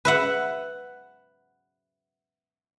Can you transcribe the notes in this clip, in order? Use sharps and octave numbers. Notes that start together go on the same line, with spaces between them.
B4 E5 F#5